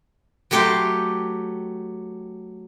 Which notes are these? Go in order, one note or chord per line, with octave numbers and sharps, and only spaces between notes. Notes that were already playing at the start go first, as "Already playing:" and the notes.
F#3 A3 G4 G5 C6